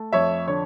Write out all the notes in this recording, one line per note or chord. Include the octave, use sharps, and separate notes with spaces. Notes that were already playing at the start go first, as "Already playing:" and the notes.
Already playing: A3
F2 C#5 E5
D3 C#5